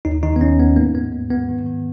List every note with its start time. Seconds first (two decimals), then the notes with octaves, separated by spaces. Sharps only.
0.05 D#2 D#4
0.23 D#3 D#4
0.36 B3
0.41 D#2 C#4
0.59 D#2 B3
0.76 G#2 A#3
0.95 G#2 B3
1.12 G#2
1.30 G#2 B3
1.49 D#3
1.66 D#3